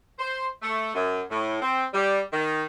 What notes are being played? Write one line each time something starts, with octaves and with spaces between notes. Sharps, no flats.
C5
A3
F#2
A2
C4
G3
D#3